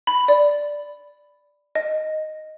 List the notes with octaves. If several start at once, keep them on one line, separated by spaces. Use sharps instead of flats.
B5
D5
D#5